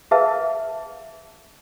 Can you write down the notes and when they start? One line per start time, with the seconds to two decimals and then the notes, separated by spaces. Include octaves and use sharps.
0.11 G#4 A#4 B4 E5 F5 A5